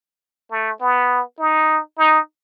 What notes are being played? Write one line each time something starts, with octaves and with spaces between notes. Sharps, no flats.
A3
B3
D#4
D#4